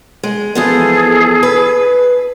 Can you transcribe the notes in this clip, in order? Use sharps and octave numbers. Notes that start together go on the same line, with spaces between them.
G#3
E3 F3 B3 G#4 A4
B4